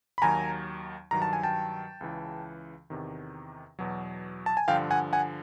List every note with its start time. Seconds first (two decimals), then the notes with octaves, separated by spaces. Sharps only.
0.18 B5
0.22 D#2 D#3 F#3 G#5 A#5
1.11 G2 D#3 F#3 A#5
1.22 A5
1.33 G#5
1.43 G5 A5
2.01 C#2 C#3 E3
2.90 E2 C3 D#3
3.79 E2 B2 F#3
4.46 A5
4.57 G#5
4.68 G2 D3 F3 F5 G5
4.91 F#5 G#5
5.13 F#5 G#5